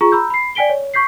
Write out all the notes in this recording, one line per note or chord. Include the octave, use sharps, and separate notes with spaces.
F4 G#4 A#5 C#6
A#5 B5 E6 G6
B5 C7
D5 G5 G#5 B6 D7 G7
C#5
C#6 G6 B6 C7